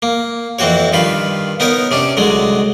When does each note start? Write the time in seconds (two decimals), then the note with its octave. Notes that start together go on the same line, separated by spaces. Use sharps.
0.02 A#3
0.59 F2 E3 C4 F#4 C#5
0.93 G2 D#3 F4 B5
1.60 B3 D#4 A#4 C#5
1.91 C3 C#4 D4
2.17 C2 D3 F#3 G#3